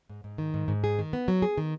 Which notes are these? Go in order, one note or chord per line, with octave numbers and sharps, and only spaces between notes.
G#2
G#2
D#3
G#2
G#2
G#4
D#3
B3
F#3
G#4
D#3